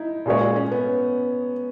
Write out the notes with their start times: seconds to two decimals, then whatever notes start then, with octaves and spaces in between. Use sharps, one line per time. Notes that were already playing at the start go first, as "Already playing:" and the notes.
Already playing: D#4 E4
0.26 A#2 G#3 C#4 G#4 C#5
0.56 C#4
0.72 B3